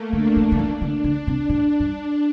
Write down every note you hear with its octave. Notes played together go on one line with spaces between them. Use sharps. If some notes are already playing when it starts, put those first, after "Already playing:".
Already playing: A3 A#3
D3 D4
D#3
D3
D#3 D4
D3
D3 D4
C3
A2
G2